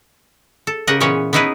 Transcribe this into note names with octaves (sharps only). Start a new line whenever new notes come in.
A4
C#3 G4 A#4 D#5 F#5
A#2 E3 B3 C#4 C#5 F#5
B3 C#4 D#4 E4 G#4 B4